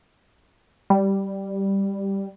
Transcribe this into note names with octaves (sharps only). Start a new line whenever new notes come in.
G3